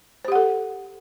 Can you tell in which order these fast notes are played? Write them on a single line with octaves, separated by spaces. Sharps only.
C5 G4 F#5 A4